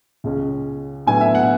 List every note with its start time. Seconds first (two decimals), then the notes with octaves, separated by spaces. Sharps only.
0.24 C#2 C#3 G#3 C#4
1.07 A2 F#3 B3 D4 G#5
1.21 E5
1.35 F#5